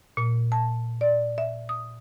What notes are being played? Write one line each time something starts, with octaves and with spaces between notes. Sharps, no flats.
A#2
A5
D5
E5
D#6